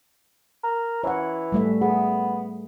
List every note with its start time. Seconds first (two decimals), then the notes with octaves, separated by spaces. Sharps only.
0.64 A#4
1.04 E3 C#5 F#5
1.52 G3 A3 E5
1.82 B3 G#4